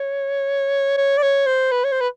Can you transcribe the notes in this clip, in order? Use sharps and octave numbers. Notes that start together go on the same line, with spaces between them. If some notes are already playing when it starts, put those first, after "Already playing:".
Already playing: C#5
C#5
D5
C#5
C5
B4
C#5
C5
B4